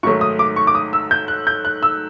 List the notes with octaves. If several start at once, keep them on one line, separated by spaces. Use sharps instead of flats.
G#2 D#3 F#3 A3 C#6
D#6
D6
C#6
D6
D#6
E6
G6
F#6
G6
F#6
E6